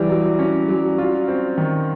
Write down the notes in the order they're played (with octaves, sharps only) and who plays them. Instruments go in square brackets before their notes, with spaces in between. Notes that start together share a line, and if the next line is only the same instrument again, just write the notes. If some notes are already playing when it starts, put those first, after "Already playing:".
Already playing: [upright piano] E3 [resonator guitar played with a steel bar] G3
[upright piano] F#3
C#4
F#3
F4
C4
D#3